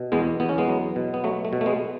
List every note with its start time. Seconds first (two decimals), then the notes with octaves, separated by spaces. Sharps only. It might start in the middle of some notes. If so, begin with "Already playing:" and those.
Already playing: B2
0.12 E2 G#3 B3
0.40 E2 B3
0.49 C#4
0.58 G#3 B3
0.68 F#3
0.96 B2
1.14 B3
1.24 F#3 A3
1.45 A3
1.53 B2
1.61 A3
1.66 G#3 B3